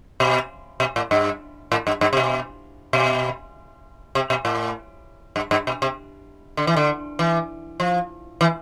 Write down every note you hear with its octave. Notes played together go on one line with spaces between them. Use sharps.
B2
B2
A2
G2
A2
G2
G2
C3
B2
B2
C3
B2
A2
G2
G2
B2
C3
D3
E3
D3
E3
F3
E3